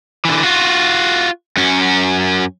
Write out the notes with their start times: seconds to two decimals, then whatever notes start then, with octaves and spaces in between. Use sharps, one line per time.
0.25 D3 E3
0.43 F4 F#4
1.57 F#2 C#4